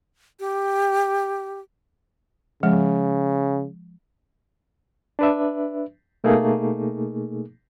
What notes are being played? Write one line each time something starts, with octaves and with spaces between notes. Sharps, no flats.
G4
C#3 F3 G#3
D4 B4 E5
B2 A3 A#3 D#4 G#4